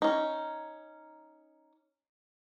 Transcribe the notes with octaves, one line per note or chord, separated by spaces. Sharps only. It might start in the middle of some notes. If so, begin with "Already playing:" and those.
C#4 D#4